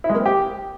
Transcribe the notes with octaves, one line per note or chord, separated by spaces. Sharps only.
E4
G#3
A#3
C4
G4